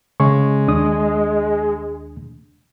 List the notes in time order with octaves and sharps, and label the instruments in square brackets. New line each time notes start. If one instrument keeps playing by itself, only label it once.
[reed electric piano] C#3 C#4 C#6 [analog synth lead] G#3
[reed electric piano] D#2 D4 D#6